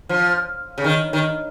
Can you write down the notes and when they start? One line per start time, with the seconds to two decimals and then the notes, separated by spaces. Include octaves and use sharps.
0.09 F3
0.78 C#3
0.84 D#3
1.13 D#3